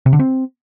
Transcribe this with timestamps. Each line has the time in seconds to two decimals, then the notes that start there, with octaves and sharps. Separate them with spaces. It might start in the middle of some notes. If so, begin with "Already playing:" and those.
0.06 C3
0.13 D3
0.19 C4